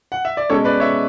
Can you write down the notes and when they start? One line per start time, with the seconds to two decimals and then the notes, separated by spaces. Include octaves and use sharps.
0.12 F#5
0.25 E5
0.37 D5
0.50 B2 G#3 C#4 A4 C#5
0.65 B4 D5
0.80 C#5 E5